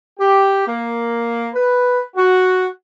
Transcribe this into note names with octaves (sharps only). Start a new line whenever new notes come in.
G4
A#3
B4
F#4